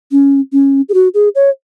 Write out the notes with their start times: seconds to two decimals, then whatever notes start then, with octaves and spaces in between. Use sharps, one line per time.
0.12 C#4
0.53 C#4
0.89 G#4
0.94 F#4
1.14 G#4
1.35 C#5